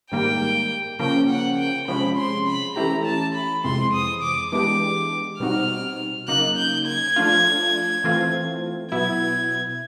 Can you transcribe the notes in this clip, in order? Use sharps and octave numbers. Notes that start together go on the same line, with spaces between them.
G#2 D#3 G3 A#3 G5
C#3 F3 A#3 C#4 G5
F#5
G5
C3 F3 G#3 C#4 B5
C6
B5
E3 A3 C#4 E4 G4 A#5
A5
B5
F2 C3 E3 G#3 C4 C6
D#6
D6
E3 G#3 B3 D4 G4 D6
B2 G3 C4 D#4 F#4 F6
C#3 F#3 A#3 D#4 F#6
G6
G#6
F3 A3 D4 F4
E3 A3 C4 F4
B2 F#3 B3 E4 G#6